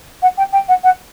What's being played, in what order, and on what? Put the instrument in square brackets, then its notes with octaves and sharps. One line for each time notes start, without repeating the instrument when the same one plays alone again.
[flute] F#5
G5
G5
F#5
F#5